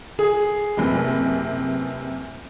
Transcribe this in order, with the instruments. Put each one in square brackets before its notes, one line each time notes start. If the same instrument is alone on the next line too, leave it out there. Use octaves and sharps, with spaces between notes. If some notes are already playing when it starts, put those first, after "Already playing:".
[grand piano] G#4
[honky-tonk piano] F#1 C3 E3